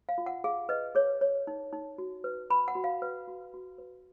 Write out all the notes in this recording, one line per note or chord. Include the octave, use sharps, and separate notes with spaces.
F5
F4
F#5
G#4 F5
B4 D#5
G#4 C#5
C#5
D#4
D#4
F#4
B4
B4 B5
F#5
F#4
F5
B4
F#4
F#4
B4